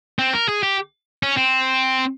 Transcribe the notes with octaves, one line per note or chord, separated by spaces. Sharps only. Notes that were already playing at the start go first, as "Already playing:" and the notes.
C4
A#4
G#4
G4
C#4
C4